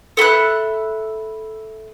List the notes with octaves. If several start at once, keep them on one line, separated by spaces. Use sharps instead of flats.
A4 E5 B5 F#6